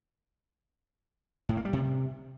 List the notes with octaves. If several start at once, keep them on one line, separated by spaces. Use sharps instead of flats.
A2
A#3
G3
C3